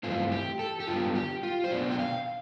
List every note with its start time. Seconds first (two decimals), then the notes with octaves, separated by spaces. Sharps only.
0.03 G2 E3 A3 C4 F4
0.31 G4
0.59 A4
0.80 G4
0.88 G2 D3 G3 B3 D4 F4
1.15 G4
1.43 F4
1.64 C5
1.71 B2 B3 D4 D5
1.91 G5
1.99 F5